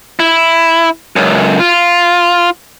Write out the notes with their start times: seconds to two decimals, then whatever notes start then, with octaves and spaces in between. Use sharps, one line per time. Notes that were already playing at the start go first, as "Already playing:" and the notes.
0.19 E4
1.16 C#2 F#2
1.59 F4